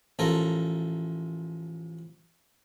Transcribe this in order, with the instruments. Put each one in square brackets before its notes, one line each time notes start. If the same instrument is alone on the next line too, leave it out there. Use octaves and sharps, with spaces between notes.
[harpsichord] A1 F3 A4 A#4